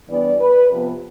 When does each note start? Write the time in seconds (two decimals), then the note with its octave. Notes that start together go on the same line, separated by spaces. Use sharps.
0.08 G2 E3 B3 D5
0.39 B4
0.70 C3 F3 B3